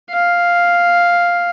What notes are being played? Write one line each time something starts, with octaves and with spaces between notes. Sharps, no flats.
F5